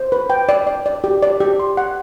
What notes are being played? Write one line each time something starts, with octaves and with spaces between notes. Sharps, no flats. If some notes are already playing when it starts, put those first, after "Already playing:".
Already playing: C5
B4
G5
D5
D5
D5
G4
D5
G4
C6
F#5